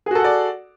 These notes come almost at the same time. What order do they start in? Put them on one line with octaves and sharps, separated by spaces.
G#4 F#4 A4 F#5 D5